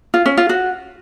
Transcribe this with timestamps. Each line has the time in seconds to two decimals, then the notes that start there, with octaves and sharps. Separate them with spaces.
0.14 F4
0.26 C#4
0.37 F4
0.49 F#4